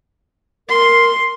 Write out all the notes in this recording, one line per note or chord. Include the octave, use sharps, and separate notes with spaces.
A#4 C6